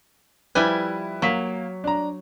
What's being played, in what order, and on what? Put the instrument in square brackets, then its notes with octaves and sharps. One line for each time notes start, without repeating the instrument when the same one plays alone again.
[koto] F3 G3 G#5 [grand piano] E4 B4
[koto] F#3 [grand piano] A#3 B6
[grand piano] D4 A#5